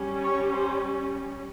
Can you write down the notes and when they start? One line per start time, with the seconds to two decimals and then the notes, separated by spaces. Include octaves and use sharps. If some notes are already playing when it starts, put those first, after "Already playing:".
Already playing: G3 C#4
0.24 C#5
0.53 C5